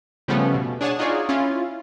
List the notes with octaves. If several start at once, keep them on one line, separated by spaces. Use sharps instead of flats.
C#3 F3 G3 A3 B3 C#4
B2
D4 G#4 C#5 F#5 G#5 A5
D#4 F4 F#4 G#4 C#5 D5
C#4 E4 F4